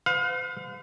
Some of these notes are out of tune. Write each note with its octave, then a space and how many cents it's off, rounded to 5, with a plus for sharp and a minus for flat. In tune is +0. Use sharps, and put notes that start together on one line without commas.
C5 -45 F5 +35